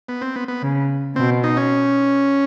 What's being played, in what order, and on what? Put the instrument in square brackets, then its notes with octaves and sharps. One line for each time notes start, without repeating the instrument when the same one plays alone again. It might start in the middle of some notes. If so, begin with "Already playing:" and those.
[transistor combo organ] B3
C4
B3
B3
[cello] C#3
[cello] B2 [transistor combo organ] C4
[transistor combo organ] D#4
C#4